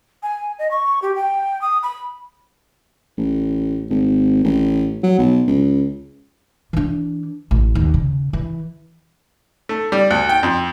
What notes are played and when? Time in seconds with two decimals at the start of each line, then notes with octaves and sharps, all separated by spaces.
0.23 G#5
0.59 D#5
0.71 C#6
1.02 G4
1.15 G5
1.61 D#6
1.83 B5
3.17 A1
3.90 G#1
4.44 A1
5.03 F#3
5.18 B1
5.47 C#2
6.73 E3 D4
7.51 A1
7.75 D#2
7.94 C#3
8.33 E3
9.69 A3
9.92 G3
10.11 D2
10.29 G5
10.43 F2